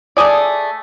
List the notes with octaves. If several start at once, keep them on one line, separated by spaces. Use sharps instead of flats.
A3 G#4 D5